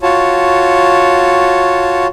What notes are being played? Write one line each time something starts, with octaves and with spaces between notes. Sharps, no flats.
F4 F#4 C#5 A5